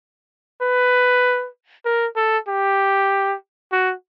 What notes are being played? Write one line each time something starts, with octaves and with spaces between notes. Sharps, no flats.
B4
A#4
A4
G4
F#4